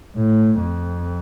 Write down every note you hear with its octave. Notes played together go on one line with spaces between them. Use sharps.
A2
F2